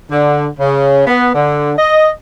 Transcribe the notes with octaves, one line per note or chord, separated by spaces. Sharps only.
D3
C#3
B3
D3
D#5